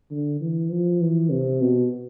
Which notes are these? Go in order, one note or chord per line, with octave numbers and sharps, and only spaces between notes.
D3
E3
F3
E3
C3
B2